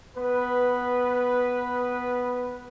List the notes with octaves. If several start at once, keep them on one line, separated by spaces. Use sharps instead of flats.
B3 B4